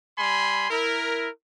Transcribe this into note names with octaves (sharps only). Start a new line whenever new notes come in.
G3 G#5 B5 C6
E4 A#4